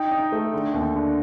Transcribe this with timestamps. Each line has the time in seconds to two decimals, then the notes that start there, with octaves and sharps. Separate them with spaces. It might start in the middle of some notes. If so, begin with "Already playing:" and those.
Already playing: D#4 G5
0.11 D#4
0.32 A3
0.53 D3
0.74 D#2
0.96 D3